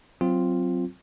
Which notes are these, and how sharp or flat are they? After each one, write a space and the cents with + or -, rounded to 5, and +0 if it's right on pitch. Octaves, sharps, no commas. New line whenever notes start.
F#3 +0 C4 +0 F4 +0